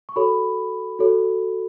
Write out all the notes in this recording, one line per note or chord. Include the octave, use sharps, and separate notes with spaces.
C#6
F#4 A4 C#5 B5
F#4 A4 C#5